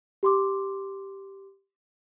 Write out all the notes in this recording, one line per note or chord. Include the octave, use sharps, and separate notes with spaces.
G4 C6 D6